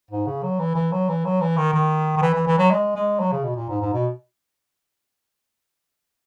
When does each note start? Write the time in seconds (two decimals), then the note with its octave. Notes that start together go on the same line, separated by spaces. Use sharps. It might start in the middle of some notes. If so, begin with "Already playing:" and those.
0.11 G#2
0.27 C#3
0.43 F#3
0.59 E3
0.75 E3
0.92 F#3
1.09 E3
1.25 F#3
1.41 E3
1.57 D#3
1.73 D#3
2.17 D#3
2.22 E3
2.34 E3
2.47 E3
2.58 F#3
2.71 G#3
2.96 G#3
3.20 F#3
3.32 C#3
3.44 B2
3.56 A#2
3.69 G#2
3.81 G#2
3.93 B2